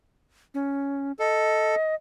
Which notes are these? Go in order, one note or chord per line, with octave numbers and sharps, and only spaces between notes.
C#4
A4 D#5